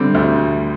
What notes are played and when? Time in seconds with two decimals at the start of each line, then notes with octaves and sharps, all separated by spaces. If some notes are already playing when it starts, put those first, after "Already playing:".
Already playing: D3 G3 C4
0.15 D2